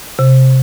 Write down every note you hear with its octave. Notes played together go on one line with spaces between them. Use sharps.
C3